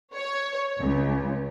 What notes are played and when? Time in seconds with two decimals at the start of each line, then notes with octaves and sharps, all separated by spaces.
0.14 C#5
0.80 C#2